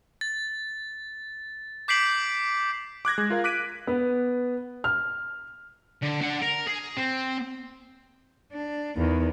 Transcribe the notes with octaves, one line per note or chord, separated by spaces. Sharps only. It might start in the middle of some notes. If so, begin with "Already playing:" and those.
A6
D6 G6 B6 C7 D7 F#7
D6 F#6 G#6 A#6
G#3
F4 A#4 F5
D6 F#6 B6 D7 D#7
B3
F6
D3
D4 F#5
A#4
G#4
C4
D4
E2 D#3